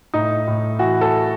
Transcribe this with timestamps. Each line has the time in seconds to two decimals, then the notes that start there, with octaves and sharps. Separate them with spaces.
0.14 A2 D#4
0.48 A2
0.79 E3 F#4
1.01 A4